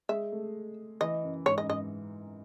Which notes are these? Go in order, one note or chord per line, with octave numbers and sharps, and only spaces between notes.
G#3 E5
A3
E3 D#5
F#2
G#2 C#5
D#5
F#2
G#2 D#5